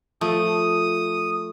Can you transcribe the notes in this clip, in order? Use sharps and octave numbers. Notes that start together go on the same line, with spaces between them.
F3 A3 D#6